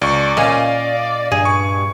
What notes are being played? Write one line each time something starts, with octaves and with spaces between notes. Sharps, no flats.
C#2 D5 C#6
A#2 C#4 D#5 F5
G2 G#4
C#6